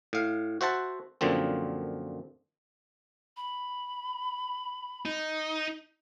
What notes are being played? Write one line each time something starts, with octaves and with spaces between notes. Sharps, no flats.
A2 F5
F#4 C5 E5 F#5 A5
F#2 A#2 D3 F3 C4
B5
D#4